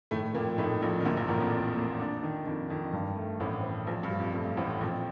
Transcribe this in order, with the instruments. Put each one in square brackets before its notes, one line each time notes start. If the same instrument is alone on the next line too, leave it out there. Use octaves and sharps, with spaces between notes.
[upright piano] A2 A3 [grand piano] D#3
[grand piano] F2 [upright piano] A#2 A#3
[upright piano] A2 A3 [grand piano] D#4
[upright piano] A#1 A#2 [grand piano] D#4
[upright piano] D#3
[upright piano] D2 D3 [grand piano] A#3
[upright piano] A#1 A#2
[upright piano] A1 A2 [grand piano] A#4
[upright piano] F2
[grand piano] D5
A#3
D4
D#3
[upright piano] F2 [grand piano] D#3
[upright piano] F2 [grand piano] D#3
[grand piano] G2
A3
[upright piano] A1 A2 [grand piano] C4
[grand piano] C4
[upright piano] A#1 A#2 [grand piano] C5
[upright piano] G2
[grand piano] G4
[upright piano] F2
[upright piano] G2 [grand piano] A3
[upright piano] A1 A2 [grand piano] C4
[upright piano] A#1 A#2 [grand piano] F2